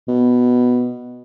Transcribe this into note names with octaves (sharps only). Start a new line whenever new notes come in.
B2